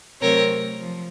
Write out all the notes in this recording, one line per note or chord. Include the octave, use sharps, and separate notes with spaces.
C3 F#3 A3 C4 A#4 C#5
F3